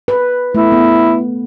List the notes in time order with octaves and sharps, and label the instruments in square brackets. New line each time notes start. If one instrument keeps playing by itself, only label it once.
[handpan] B4
[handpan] A3 B3 [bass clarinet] E4
[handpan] B3